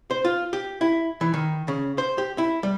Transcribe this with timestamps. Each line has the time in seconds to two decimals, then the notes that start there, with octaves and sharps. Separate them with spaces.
0.11 C5
0.25 F4
0.53 G4
0.81 E4
1.21 E3
1.34 D#3
1.68 C#3
1.98 C5
2.18 G4
2.38 E4
2.63 G3